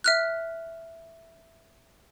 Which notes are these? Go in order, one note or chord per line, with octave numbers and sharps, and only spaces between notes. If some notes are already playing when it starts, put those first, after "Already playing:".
E5 F6 F#6